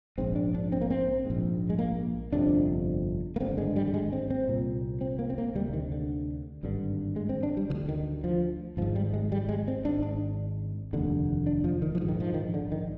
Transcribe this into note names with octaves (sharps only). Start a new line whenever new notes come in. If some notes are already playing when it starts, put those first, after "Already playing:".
A#1 G#2 C4
D4
D4
C4
A#3
C4
A#1 G#2
G#3
A#3
G1 F2 C3 D4
A#3
G#1 G2 D3 C4
G#3
G3
G3
G#3
C4
C4
C2 A#2
C4
A#3
C4
A#3
D2 C3 G3
D#3
D3
G#1 G2 D3
G#3
C4
D4
G3
D2 D3 D#3
D#3
F3
G#1 G#2 F3
G3
G#3
G3
G#3
C4
G#1 G#2 D4
D4
F1 D#2 D3
D4
F3
D#3
F3
A#1 G#2
D#3
F3
D#3
D3
D#3